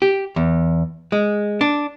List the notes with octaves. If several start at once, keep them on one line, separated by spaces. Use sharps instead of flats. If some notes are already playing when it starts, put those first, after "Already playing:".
G4
E2
G#3
D4